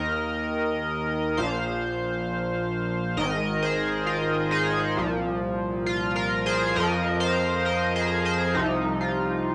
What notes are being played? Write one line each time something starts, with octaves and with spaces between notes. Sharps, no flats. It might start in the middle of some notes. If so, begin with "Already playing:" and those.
Already playing: D#2 D#3 A#4 D#5
A#1 A#2 F3 C5 F5
G#1 G#2 D#3 A#4 D#5
G#4 C5
F4 A#4
D#4 G#4
C2 A#2 F3
F4
F4 A#4
G#4 C5
F2 F3 A#4 D#5
C5 F5
A#4 D#5
G#4 C5
G#4 C5
C2 C3 F3 D#4
F4